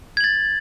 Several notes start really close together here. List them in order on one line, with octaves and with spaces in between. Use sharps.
G#6 F#7 A6